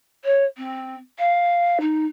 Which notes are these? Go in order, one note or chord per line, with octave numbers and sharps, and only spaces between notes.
C#5
C4
F5
D#4